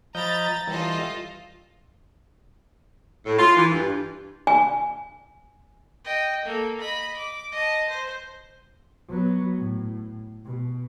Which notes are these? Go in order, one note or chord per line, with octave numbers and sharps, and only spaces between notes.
F3 D#5 A#5 B5 G6 A6
E3 G3 F4 A4 D#5
A2
F4
E3
G2
G#5
D#5 G5
A#3 A4
D#5 B5
D6
D#5 A5
C5
F#3 B3
A2
B2